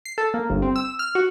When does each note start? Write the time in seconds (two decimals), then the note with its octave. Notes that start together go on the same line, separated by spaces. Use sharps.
0.05 C7
0.18 A4
0.34 A#3
0.50 G1
0.62 C4
0.76 E6
0.99 F6
1.15 F#4